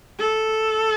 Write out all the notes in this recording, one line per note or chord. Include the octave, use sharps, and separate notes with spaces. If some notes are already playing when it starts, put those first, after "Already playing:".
A4